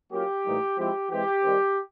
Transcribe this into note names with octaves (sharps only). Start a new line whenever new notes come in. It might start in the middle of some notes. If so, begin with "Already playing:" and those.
F#3 A#3 C#4 F4 G4
A2 E3 G3 A#3 D#4
F3 G#3 C4 E4 G4
E3 G#3 C4 G4
D#3 G3 C4